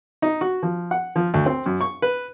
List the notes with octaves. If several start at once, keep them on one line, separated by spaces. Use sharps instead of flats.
D#4
F#4
F3
F#5
F3
D2
C4
F#2
C#6
B4